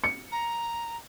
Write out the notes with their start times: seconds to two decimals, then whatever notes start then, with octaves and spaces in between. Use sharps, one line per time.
0.04 C#7
0.32 A#5